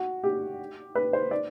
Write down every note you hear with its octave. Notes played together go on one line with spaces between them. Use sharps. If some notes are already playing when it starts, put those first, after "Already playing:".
Already playing: F#4
G4
B4
C5
D5